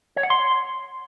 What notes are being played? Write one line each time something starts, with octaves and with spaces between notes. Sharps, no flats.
C#5
F#5
C6